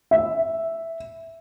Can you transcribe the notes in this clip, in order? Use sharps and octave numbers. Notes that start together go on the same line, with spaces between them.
E5